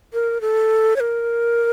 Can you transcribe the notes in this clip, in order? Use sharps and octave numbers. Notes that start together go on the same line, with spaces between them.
A#4
A4
C#5
A#4